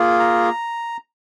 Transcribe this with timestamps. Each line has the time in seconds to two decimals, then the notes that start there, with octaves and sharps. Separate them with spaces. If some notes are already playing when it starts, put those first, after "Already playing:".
Already playing: A#3 F4 G#4
0.20 A#5